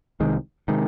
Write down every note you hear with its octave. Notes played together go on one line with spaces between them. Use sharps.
C2 C3 D#3 G#3
C3 D#3 G#3